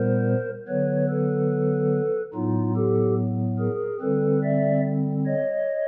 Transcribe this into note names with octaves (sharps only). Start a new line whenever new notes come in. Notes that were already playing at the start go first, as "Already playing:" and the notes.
Already playing: A#2 G3 B3 A#4 C5
D3 F#3 B3 B4 C#5
A4 B4
A2 F#3 B3 D#4 F4
G4 A4
G#4 A#4
D3 G3 C4 A4 B4
D5 E5
C#5 D#5